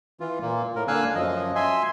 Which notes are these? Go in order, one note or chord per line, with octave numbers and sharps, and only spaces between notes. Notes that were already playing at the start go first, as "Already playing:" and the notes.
E3 F4
A#2 A#3
A2 A#4
D3 A#3 F5 G#5 E6 F#6
F#2 F3 D#5
E5 G#5 C6